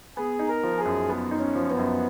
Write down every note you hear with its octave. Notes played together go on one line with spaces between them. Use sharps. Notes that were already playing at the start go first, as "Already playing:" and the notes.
B3 G#4
D#4
A#4
F3
G#4
F#2
B3
D#4
C#4
F3
B3
F#2